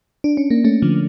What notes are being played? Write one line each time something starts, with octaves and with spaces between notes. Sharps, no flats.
D4
C#4
A#3
A3 C#4
D3 F3